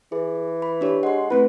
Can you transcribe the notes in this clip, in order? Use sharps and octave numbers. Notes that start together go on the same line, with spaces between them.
E3 G#4
B5
D4 G4 C#5
G#3 F#5 C6
A3 C4 E4 B4